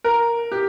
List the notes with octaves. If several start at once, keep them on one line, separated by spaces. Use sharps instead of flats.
A#4
G4